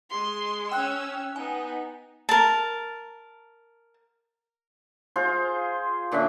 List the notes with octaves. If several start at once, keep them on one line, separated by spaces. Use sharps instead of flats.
G#3 C6
C#4 G5 E6 F#6
B3 D#4 G#5
A#4 A5
F4 G#4 C5
A#2 D3 C#4 E5